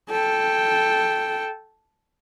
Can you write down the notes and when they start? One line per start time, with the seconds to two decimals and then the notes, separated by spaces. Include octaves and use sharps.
0.10 A4 G5